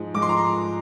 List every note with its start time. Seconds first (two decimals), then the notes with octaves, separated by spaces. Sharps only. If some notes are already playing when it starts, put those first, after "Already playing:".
Already playing: G#2 F3 G#3
0.14 G#2 F3 G#3 D6
0.22 C6
0.29 A#5
0.37 C6